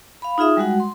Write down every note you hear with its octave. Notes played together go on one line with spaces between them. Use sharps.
F5 B5
D#4 F4 G#4 E5 D#6
G3 G#3 F#4 F#5
C6